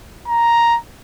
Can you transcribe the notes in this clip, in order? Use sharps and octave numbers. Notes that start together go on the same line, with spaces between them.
A#5